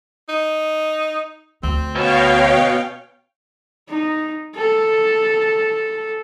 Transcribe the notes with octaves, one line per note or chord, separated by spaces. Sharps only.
D#4
D2 C4
B2 C#4 C#5 F5 G5
D#4
A4